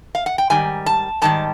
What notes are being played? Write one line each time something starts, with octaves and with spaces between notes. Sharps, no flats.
F5
F#5
G5
G#2 D#3 G3 G#5
A5
G#2 D#3 G3 A5